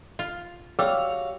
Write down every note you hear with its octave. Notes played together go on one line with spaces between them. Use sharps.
F4
G3 F#4 G#4 C#5 F5 E6